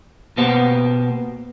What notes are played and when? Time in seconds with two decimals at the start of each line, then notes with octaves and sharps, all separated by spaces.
0.37 B2 A#3 B3 G4 C5 F#5